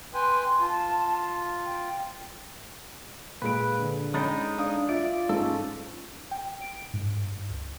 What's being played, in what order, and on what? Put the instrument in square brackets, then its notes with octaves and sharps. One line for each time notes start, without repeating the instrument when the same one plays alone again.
[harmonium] B4 G5 G#5 [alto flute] C6
[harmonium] F4 [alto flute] A5
[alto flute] G5
[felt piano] A#2 G#3 D7 [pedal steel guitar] B4
[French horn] D3
[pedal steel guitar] G#3 D#4 G5 [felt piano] C#4 B5 A6
[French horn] D4 [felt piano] F5 D#6
[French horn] F4 [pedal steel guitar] D5 [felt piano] E5
[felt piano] G#2 [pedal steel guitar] C#4 A4
[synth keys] G5
D7
G#2
G2
C#2